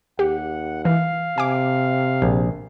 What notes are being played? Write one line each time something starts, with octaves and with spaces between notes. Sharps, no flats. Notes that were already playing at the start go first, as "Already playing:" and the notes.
D#2 G4 F#5
E3 F5
C3 G#5 D6
A#1